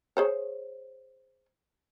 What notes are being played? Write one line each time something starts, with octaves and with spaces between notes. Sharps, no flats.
G#4 C5 C#5